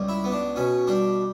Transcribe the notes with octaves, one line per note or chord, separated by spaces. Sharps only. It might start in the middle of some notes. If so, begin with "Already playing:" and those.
Already playing: C#2 G3
E4
B3
D4
B2 C#4
G3 D4